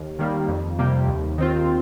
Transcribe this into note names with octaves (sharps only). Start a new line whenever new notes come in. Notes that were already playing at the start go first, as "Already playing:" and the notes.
Already playing: D#2
D#3 G3 A#3
F2
C3 G3 A#3 G4
D#2
D#3 C4 F4